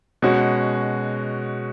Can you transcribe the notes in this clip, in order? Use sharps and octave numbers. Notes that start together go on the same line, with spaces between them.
B2 G#3 C#4 F#4